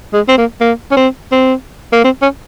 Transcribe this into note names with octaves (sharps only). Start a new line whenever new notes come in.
G#3
C4
A#3
A#3
C#4
C4
C4
A#3
C4
C#4